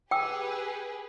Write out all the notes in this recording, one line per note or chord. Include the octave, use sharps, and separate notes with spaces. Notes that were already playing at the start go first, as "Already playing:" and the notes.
G4 G#4 B4 G5 D6 E6